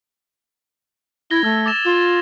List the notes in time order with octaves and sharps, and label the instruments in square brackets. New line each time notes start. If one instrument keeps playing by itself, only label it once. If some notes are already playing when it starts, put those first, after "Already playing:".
[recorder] E4 [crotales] G#6 A#6 G7
[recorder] A3 [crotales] E6
[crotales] D6 A6 E7
[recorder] F4